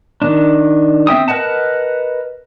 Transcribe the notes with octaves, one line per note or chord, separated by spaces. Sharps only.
D#3 D4
C4 E5 G5 D#6
A#4 B4 D#5 F#5 A5